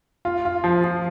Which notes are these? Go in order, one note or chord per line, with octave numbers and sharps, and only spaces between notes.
F4
F4
F3
F3